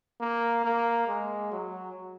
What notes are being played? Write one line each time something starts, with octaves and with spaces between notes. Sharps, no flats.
A#3
A#3
G#3
F#3